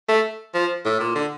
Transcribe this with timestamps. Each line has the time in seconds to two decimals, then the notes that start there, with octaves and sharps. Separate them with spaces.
0.09 A3
0.55 F3
0.85 A2
1.01 A#2
1.16 D3